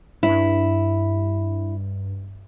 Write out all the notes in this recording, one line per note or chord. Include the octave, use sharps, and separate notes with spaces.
G2 E4